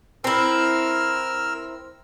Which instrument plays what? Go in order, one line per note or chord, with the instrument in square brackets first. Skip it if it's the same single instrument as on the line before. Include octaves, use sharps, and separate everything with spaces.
[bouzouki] C4 E4 [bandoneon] A#4 E6 F6